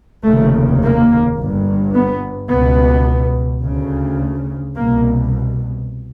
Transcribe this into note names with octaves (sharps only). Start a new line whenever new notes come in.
F1 D#2 C#3 A3
A#3
G1
G2
B3
C#2 B2 B3
D2 C#3
C2 B2 A#3